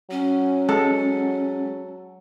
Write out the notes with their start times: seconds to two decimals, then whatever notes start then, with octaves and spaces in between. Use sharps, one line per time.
0.11 F#3 C#4
0.69 G#3 A4